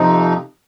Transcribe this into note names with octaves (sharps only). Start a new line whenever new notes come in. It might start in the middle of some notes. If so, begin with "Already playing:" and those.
Already playing: F2 C3 F3 C4 D#4